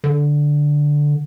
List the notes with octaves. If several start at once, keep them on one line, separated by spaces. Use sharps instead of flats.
D3